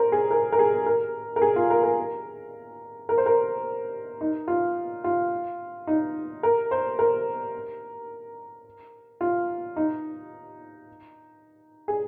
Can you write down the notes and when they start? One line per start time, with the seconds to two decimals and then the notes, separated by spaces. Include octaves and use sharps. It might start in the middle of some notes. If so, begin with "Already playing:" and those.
Already playing: A#4 C5
0.12 G#4
0.31 A#4
0.52 A#4
0.59 G#4
0.86 A#4
1.36 A#4
1.42 G#4
1.56 F4
1.70 A#4
1.83 A#4
3.09 A#4
3.18 C5
3.26 A#4
4.21 D#4
4.48 F4
5.04 F4
5.87 D#4
6.43 A#4
6.71 C5
6.99 A#4
9.21 F4
9.76 D#4
11.88 G#4